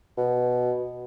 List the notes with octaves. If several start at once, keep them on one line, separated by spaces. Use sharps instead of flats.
B2